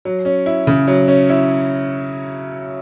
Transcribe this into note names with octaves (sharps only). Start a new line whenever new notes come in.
F#3
C#4
E4
C#3
F#3
C#4
E4